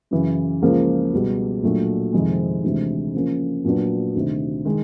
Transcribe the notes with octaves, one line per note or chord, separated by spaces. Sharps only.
F#2 C#3 E3
C#2 C#3 F3 A#3
C#2 B2 G3
A#2 F#3 A3 D4
F2 C3 D#3 G#3
D2 C3 E3 G#3
C#3 F3 A#3 C#4
A#2 F#3 B3 D4
D2 C3 D#3
D#3 G#3